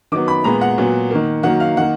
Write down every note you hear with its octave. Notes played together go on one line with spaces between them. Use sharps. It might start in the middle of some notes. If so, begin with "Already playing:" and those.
D#3 F#3 B3 D6
B5
A#2 G#3 B3 A#5
F#5
A#2 F#3 B3
D#3 A#3
D#3 F#3 A#3 F#5
F5
D#3 A#3 F#5